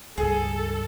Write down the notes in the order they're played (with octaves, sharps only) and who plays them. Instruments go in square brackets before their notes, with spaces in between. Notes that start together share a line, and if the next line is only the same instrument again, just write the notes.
[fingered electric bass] C#2 G2 [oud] G#4 [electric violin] A4